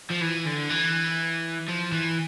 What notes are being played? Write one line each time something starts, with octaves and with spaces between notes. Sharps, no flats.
F3
E3
D3
E3
F3
E3